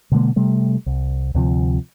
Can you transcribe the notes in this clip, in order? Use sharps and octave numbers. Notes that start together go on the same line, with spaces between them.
B2 D3 G#3 A#3
C3 G3 A3
C2
D2 C3 F3